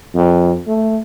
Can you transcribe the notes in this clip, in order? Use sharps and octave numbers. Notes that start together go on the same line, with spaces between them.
F2
A3